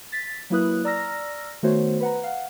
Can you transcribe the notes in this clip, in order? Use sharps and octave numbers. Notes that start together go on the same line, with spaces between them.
A6 B6
F#3 A#3 E4 B4 D#6 F#6
D5 A#5 E6 F6 A#6
D#3 A3 B3 F#4 C5 C#5
B4 F#5 A#5
F5 F#5